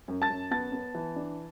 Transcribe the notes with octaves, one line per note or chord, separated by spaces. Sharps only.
F#2
A5 A6
F#2
B3 A5 A6
B3
E3
D4